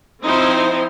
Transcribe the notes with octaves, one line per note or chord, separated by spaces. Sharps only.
F3 C4 D#4 E4 C5